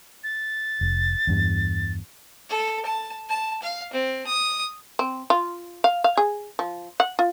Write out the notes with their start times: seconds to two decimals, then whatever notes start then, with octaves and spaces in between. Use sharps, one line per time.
0.24 A6
0.81 F1
1.27 E2 G2
2.49 A4
2.86 A5
3.29 A5
3.62 F5
3.93 C4
4.27 D#6
4.99 C4
5.30 F4
5.84 F5
6.04 F5
6.17 G#4
6.59 F3
7.00 F#5
7.19 F4